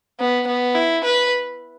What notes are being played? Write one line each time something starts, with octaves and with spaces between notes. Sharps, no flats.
B3
B3
E4
B4